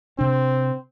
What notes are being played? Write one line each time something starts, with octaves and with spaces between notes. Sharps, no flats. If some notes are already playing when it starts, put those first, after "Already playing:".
C3 C4 D4